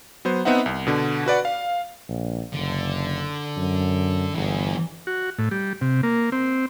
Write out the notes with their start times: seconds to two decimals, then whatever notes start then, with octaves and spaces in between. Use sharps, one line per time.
0.25 F#3 B3 C5
0.45 B3 C4 D#4 E5 F#5
0.66 C2
0.87 B2 D3
1.26 F#4 B4 D5 F#5
1.45 F5
2.09 A#1
2.54 F#1 D3
3.57 F#2
4.35 G1 E3 G#4
5.07 F#4
5.39 A2
5.51 G3
5.81 C3
6.03 A#3
6.32 C4